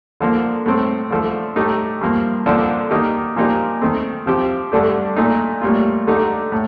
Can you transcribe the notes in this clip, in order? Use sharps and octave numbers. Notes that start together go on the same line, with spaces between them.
D3 F3 A#3
A2 A3 C4
D3 F3 A3
A2 A3 D#4 G4
G2 F3 A#3
F2 D3 F3 A#3 D4
D#3 A#3 D#4 G4
A#2 F3 A#3 D#4 G4
D#3 A3 C4
C3 F3 C4 G4
G2 D3 A3 D4 G4
A#2 A3 D#4
A2 G3 A#3 F4
D3 A3 D#4 G4
A2